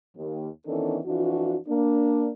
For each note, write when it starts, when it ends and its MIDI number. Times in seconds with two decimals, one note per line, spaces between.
0.17 0.48 39
0.67 0.98 51
0.67 0.98 52
0.67 0.98 59
0.67 0.98 61
0.67 0.98 62
0.67 0.98 69
1.06 1.55 41
1.06 1.55 52
1.06 1.55 62
1.06 1.55 65
1.06 1.55 66
1.68 2.29 58
1.68 2.29 62